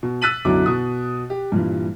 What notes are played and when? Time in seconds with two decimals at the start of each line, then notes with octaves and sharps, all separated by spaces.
0.03 B2
0.22 E6 F#6 A6 B6 D#7 F#7
0.45 B1 F#2 D3 F#3 E4 D6
0.66 B2 D#6
1.30 G4
1.52 G2 A#2 E3